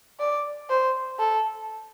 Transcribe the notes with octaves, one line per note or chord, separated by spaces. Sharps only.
D5
C5
A4